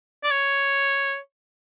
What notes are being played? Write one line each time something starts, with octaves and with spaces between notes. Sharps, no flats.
D5
C#5